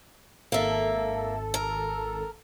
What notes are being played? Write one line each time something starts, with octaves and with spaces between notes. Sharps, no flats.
G#1 A#3 A4 E5
A#4